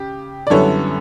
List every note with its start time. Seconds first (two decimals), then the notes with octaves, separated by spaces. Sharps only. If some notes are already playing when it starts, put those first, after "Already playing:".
Already playing: C#3 G4
0.47 D5
0.50 F#2 D3 G3 B3 E4 A4 C#5